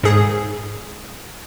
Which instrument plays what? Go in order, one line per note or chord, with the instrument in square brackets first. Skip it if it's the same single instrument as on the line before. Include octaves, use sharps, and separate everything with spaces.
[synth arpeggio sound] G#2 G#4